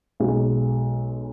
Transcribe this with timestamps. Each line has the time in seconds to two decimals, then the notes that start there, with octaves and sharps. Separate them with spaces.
0.20 B1 B2 G#3